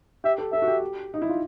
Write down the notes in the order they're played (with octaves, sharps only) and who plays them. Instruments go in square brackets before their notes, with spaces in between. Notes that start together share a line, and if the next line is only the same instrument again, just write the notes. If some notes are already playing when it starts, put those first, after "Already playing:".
[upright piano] G4 [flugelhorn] E5
[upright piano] A4
[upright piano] A4 [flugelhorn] E5
[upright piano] F#4
G4
D#4
E4
F4